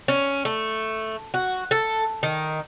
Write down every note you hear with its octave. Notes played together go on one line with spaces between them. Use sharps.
C#4
A3
F#4
A4
D#3